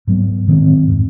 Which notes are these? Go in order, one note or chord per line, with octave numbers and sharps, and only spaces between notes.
G#2 F#3 B3
A2 D#3 G#3 C4
F2 G#2